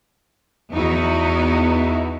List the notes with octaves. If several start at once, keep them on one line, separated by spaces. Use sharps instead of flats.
E2 B3 D#4 E4 F#4